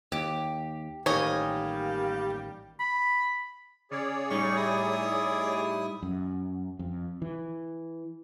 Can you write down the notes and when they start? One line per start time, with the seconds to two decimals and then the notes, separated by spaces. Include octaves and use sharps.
0.12 D#2 G4
1.06 A1 D#3 G3 A#3 G4 C#5 D#5 G#5
2.80 B5
3.91 C#3 G#4 C#5 D5
4.30 A2 G3 D#4 C#6
4.57 E4 D#6
6.02 F#2
6.79 F2
7.22 E3